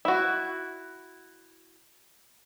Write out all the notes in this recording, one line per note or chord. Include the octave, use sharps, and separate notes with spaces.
E4 F#4